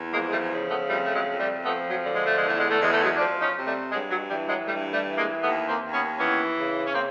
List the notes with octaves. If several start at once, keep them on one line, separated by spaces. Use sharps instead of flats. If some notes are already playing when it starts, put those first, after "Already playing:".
Already playing: E2
F3 G#3 A#3
G#3
G3 A3
C#3
A3 B3
F2 G3 A3
A3
F#3 G#3
F2
G3 A3
F3 A3 B3
F#3
D3
G#3
A3
E2 G#3
A3
G#3
A3
E2 G#3
A3
F#3 G#3
F3 C4 D4
C#4 D#4
C3
G3 A3
G2 F#3 G#3
F#3
E3 G3
F#3 G#3
G2 G3 A3
G3 A3
E3
G#3 A#3
D#2 A3 B3
A#3 C4
D#2
B3 C#4
E3 B3 C#4
C#3
C#4
A#3 C4